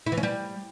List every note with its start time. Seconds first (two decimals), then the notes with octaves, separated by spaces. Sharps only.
0.06 E4
0.12 E3
0.18 C#4
0.23 G3